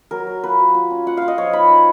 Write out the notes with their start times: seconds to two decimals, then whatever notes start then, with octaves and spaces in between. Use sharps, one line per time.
0.11 F#3 A#4
0.27 F#3
0.43 F4 B4
0.60 F#3
0.74 F4
0.90 C#4
1.06 F4 F#5
1.17 F4 F5
1.28 D#5
1.38 F3 C#5
1.53 D#4 B5
1.70 D#4